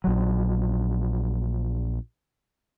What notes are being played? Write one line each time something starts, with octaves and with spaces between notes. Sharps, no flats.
A#1 F#3